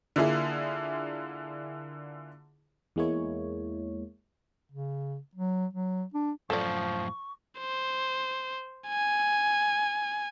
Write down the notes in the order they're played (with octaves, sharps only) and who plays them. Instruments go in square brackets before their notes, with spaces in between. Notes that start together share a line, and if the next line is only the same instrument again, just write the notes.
[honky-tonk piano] D3 A#3 E4 F4 G#4
[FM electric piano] E2 E3 G#3 A#3 E4 C#5
[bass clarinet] C#3
F#3
F#3
D4
[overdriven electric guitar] F#2 A2 [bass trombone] F3 [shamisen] A4 D5 [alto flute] C#6
[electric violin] C5
G#5